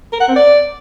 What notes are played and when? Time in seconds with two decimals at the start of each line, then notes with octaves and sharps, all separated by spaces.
0.12 A#4
0.20 F#5
0.28 C4
0.36 D5